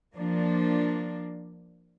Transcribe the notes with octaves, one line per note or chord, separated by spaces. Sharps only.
F3 A#3 D4